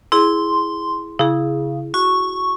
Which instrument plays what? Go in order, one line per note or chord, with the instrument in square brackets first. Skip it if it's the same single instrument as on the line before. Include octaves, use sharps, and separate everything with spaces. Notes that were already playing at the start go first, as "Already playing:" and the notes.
[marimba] E4 G#4 [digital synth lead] C6
[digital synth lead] C#3 [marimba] E4 G#4
[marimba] F#4 [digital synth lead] C#6